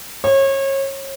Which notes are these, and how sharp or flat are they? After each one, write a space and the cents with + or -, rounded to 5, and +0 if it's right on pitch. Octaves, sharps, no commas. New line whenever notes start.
C#5 -30